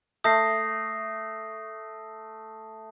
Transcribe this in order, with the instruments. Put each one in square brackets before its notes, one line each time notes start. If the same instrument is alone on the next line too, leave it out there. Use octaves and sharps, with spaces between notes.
[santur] A3 [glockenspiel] D#6 A#6 C7